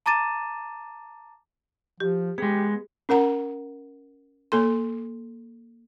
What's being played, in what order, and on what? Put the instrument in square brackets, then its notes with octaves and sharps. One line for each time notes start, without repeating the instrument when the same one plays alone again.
[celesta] A5 A#5 D6 A6 D#7 E7
[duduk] F3 [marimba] G4
[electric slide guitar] G#3 B3 [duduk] G4 [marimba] G#4
[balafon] C#4 A#4 F#5 A#5
A#3 A4 C6